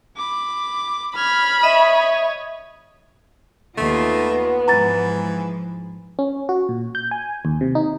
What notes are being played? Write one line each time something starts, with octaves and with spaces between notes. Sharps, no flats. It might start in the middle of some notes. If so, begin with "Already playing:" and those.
B5 D6
B5 F6 G#6
C#5 D#5 E5 D#6
D#2 A3 B3 F4 D#5
G#2 E3 F3 A#5 A6
C#4
F#4
A#2
G6
G#5
D#2
C3
D#4